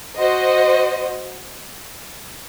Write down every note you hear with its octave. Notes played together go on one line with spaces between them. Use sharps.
F#4 C5 D#5